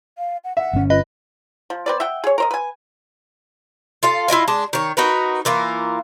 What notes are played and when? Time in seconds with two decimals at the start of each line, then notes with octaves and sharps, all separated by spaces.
0.18 F5
0.44 F#5
0.57 E5 F#5
0.73 G1 C#4
0.90 F4 B4 D#5
1.70 F3
1.86 C4 B4 D5
2.00 E5 F#5 G5
2.24 G#4 C#5
2.38 A#4 C5 D#5
2.51 B4 G#5
4.03 F4 A4 F5
4.28 E4 F4 D#5 G#5
4.48 G#3 D4 A5
4.73 D#3 C#5
4.97 D#4 F#4 A#4 B4
5.45 E3 A#3 F4 A#4